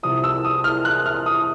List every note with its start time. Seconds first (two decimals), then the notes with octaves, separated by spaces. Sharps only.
0.03 C2 C3 F3 D#6
0.24 E6
0.45 D#6
0.64 F6
0.85 F#6
1.06 F6
1.26 D#6